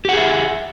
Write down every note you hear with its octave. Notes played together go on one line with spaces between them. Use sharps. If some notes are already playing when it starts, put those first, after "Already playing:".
G4 G#4 E5 F#5